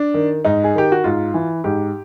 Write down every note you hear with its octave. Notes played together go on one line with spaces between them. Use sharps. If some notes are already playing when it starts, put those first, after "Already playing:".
Already playing: D4
D#3
G#2 D#4
G#4
D#3 G4
F#4
G#2 F4
E3
G#2 G4